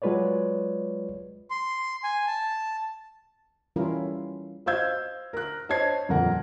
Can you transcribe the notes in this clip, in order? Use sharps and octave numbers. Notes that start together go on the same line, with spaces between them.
F#3 G#3 F4 B4 C#5 D5
C6
G#5
A5
E3 G3 C#4 E4 F4 A#4
C5 D#5 F5 E6 G6 G#6
A#4 F#6
C5 C#5 D#5 A5 G#6 C7
D#1 F2 A#4 F#5